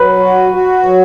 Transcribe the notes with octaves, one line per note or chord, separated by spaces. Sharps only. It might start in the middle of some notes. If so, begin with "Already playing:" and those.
Already playing: F#3 B4
F#4
F#4
F#3